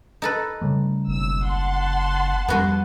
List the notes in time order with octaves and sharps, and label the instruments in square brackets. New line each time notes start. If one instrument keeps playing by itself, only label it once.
[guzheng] D#4 A4 B4
[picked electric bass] C#3 G3 A3
[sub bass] F#1 [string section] B1 E6
[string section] F#5 A5 C6
[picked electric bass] F2 G3 [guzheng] B3 F#4 B4